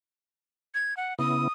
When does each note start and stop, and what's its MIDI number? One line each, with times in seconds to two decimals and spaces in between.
0.74 0.96 92
0.97 1.14 78
1.19 1.48 49
1.19 1.48 59
1.19 1.48 64
1.19 1.52 87